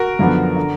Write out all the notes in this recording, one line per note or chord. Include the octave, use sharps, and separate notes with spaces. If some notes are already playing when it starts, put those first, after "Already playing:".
Already playing: F#4 A#4
F#2 D3 F3 B3
D3